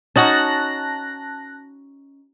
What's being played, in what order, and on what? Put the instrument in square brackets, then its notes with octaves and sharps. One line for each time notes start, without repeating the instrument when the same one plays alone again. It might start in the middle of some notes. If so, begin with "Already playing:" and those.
[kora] C#4 D#4 F#4 [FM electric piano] A5 F#6 A#6